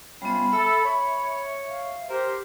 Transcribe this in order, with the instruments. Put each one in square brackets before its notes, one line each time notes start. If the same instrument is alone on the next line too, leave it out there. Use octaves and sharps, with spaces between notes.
[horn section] C3 C#4 F4 [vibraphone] G3 B3 [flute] B5
[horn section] A4 [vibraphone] E5
[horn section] C#5
[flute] F5
[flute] G4 [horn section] A#4 C5